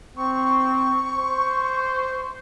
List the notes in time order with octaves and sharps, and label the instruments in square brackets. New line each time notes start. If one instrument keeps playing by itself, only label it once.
[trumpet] C4 [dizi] C#6
[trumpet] C5